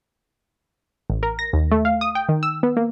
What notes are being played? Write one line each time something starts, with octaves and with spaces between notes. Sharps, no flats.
A1
A#4
A#6
D#2
A3
F5
D#6
G5
D#3
E6
B3
A#3